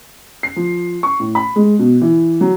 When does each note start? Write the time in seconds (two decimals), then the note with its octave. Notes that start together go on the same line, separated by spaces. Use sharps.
0.43 C7
0.56 F3
1.03 C#6
1.20 A2
1.35 B5
1.56 G#3
1.79 B2
2.02 E3
2.41 F#3